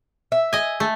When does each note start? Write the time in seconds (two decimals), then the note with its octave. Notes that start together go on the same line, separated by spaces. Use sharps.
0.32 E5
0.53 D#5 G#5
0.80 A3